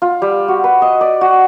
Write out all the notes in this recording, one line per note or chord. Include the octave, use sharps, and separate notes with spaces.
F4
G3
F#4
B4
D#5
D5
F#4